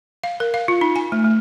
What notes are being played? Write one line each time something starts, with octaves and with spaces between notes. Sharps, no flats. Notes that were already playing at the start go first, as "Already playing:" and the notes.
F5
A#4
F5
F4
D#4
G#5
A3
A3